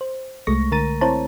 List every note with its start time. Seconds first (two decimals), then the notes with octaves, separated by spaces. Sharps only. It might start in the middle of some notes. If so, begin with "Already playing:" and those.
0.01 C5
0.47 C2 G#3 A3 C#6 A#6
0.72 D3 A#4 A#5 A6 D#7
1.01 C4 E4 C5 C#5 A5 A#5